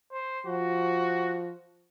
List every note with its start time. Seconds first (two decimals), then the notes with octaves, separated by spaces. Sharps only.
0.12 C5
0.47 F3 F#4